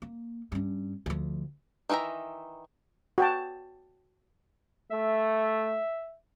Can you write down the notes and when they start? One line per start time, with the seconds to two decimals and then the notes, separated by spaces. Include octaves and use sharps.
0.02 A#3
0.52 G2 C#4
1.06 D2 F3
1.89 D#3 E3 F4 E5 A#5
3.18 F#4 G5 A5
4.91 A3 E5